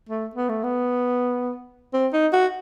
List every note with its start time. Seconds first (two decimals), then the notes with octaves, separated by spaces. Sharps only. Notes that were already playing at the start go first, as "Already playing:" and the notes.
0.09 A3
0.35 B3
0.49 A3
0.64 B3
1.94 C4
2.13 D#4
2.33 F#4